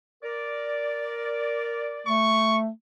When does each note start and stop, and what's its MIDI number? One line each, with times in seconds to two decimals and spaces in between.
0.23 2.14 70
0.23 2.14 74
2.07 2.69 57
2.07 2.58 85